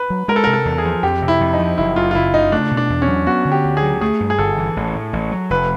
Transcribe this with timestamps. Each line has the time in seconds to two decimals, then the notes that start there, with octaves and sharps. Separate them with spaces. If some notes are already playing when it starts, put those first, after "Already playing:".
Already playing: B4
0.10 F#3
0.28 G#3 A#4
0.36 A4
0.44 C3 A#4
0.53 A4
0.65 E2
0.78 G#4
0.85 F3
1.03 F2 G4
1.22 C3
1.28 E4
1.41 F2
1.53 D#4
1.60 F3
1.78 F#1 E4
1.96 F#2 F4
2.11 F4
2.15 F#1 E4
2.34 C#3 D#4
2.52 A3 D4
2.71 B2
2.77 D4
2.90 E2
3.02 C#4
3.08 F#3
3.26 B3 F#4
3.45 D3
3.52 G4
3.65 D2
3.77 G#4
3.82 F#3
4.01 A3 G#4
4.20 G2
4.30 G#4
4.38 G1 A4
4.58 E3
4.77 A1
4.95 A2
5.13 A1
5.32 F#3
5.50 F1 B4